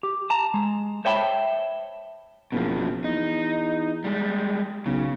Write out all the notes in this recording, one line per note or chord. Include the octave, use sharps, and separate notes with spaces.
G4
A5 A#5
G#3
C5 C#5 E5 G5 A5 B5
F#1 B2 F3
E2 D#4
G3 G#3
B1 C#3